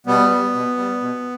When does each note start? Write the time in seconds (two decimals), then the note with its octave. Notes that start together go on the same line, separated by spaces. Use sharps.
0.06 B2 G3 B3
0.31 G3
0.54 B2
0.77 G3
1.01 B2